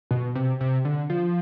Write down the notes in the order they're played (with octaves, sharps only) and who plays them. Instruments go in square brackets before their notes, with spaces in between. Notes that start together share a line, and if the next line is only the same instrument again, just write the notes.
[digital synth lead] B2
C3
C3
D3
F3